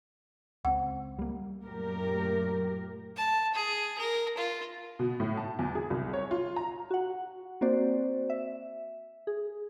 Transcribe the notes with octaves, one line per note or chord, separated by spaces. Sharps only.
C#2 C4 F#5
G3 A#3
F#2 A#2 F#3 A3 G4 A#4
A5
G#4
A#4
F4
B2
A2
A5
E2
G#4
C2
C#5
F4
A#5
F#4 F#5
A#3 C4 F#4 C5 D5
E5
G#4